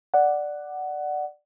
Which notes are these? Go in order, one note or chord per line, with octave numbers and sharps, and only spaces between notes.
D5 F#5